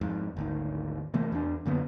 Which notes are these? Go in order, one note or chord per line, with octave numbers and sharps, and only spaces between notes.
F2 G#2
G#1 D2 D#3
C3 E3 A3 A#3
E2 D4
F#2 D3 A#3 B3